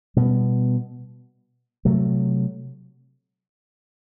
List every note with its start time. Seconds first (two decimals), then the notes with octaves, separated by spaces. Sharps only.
0.16 B2 G3 B3
1.85 C3 F#3 A3